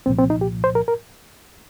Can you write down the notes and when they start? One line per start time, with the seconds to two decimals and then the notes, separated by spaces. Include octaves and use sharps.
0.06 C2 A#2 F3 C4
0.19 C4
0.30 D#4
0.41 G4
0.64 C5
0.75 A#4
0.88 A#4